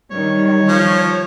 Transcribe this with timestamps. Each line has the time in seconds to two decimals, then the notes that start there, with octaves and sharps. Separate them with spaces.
0.11 D#3 G3 C#5
0.68 F3